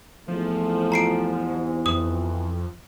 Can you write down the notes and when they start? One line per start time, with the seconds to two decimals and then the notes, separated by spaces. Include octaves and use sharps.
0.28 E2 G#2 C3 F3 A3
0.92 A#5 C7 D7
1.86 F2 E3 D#6